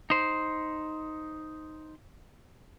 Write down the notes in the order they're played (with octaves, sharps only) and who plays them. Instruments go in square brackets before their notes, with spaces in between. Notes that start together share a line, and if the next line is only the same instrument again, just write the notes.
[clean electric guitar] D#4 C5